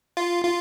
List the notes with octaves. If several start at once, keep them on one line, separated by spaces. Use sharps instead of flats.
F4
F4